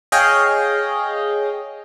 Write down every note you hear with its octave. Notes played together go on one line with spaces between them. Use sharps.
G#4 C#5 D#5 F5 G5